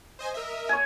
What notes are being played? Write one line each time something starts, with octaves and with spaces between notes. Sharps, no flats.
C5 D#5 G#5
A#4 D#5 E5
C#5 G#5